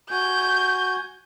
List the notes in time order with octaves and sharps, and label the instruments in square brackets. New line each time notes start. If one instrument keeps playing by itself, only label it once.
[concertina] F#4 G#5 [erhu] G6